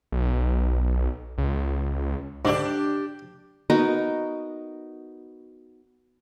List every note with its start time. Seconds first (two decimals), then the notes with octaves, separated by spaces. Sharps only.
0.12 B1
1.38 C#2
2.45 G#2 D3 D4 G4
3.70 B3 D#4 F#4 A#4